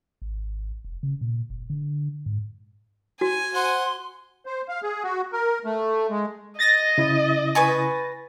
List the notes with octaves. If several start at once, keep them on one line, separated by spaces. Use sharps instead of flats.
G#1
F1
C#3
A#2
F#1
D3
G#2
F#4 G#5
C5 F#5 C6
C5
F5
G#4
F#4
A#4
A3
G#3
D#5 A6 A#6
C#3 E4
B4 G#5 C#6